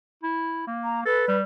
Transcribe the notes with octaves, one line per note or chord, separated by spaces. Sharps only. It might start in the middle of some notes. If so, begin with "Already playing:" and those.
E4
A#3
A#5
A4 B4
G3